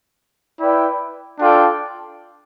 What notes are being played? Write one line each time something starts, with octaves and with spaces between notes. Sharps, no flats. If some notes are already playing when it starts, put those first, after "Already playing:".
E4 B4 D5 G5
D4 F4 A4 D5 G5